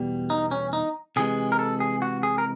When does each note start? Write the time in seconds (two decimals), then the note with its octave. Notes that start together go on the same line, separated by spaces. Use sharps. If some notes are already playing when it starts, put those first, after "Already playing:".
Already playing: E2 B2 G3
0.30 D#4
0.51 C#4
0.73 D#4
1.16 C3 E3 G#3 G#4
1.52 A#4
1.59 A4
1.80 G#4
2.02 F#4
2.23 G#4
2.38 A#4